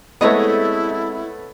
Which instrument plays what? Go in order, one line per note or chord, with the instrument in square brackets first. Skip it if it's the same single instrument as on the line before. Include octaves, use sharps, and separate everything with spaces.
[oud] G#3 C4 A4 [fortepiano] A3 B3 [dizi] E4 [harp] C#5 D#5